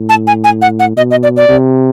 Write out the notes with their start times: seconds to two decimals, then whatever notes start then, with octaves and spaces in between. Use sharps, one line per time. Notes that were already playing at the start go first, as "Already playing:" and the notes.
Already playing: A2
0.09 A5
0.27 G#5
0.44 G#5
0.62 F#5
0.80 F#5
0.97 B2 D#5
1.11 D#5
1.23 D5
1.37 D5
1.49 C3